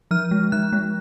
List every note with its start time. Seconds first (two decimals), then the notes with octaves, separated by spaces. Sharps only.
0.11 F3 F6
0.31 G#3
0.52 F3 F#6
0.72 G#3